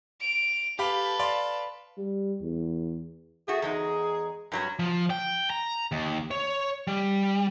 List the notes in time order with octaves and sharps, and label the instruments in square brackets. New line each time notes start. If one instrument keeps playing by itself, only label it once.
[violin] D7 F7
[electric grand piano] G4 F5 B5 [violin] A4 B4
[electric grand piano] D5 F5 C6
[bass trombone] G3
E2
[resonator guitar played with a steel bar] A3 F#4 [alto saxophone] G#4
[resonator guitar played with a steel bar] E2 G#3 D#4
G2 F#3 C#4
[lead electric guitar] F3
G5
A#5
D#2
C#5
G3